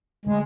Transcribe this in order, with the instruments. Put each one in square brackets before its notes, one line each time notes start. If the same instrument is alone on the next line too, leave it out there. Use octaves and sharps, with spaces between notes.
[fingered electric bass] D3 F3 A3 [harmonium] G#3